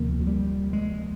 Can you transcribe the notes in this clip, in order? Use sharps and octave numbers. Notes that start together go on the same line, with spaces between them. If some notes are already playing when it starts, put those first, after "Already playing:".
Already playing: D2 C3 F3 A#3
F#3
G3
G#3